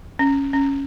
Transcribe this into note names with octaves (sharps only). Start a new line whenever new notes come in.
C#4
C#4